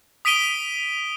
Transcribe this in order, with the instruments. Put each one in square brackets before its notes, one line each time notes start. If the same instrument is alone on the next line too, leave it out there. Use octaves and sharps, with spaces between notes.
[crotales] D#6 B6 D7 D#7 G7